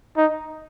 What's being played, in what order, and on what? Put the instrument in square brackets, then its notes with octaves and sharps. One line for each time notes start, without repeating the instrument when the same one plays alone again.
[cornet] D#4